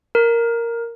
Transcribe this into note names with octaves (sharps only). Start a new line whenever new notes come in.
A#4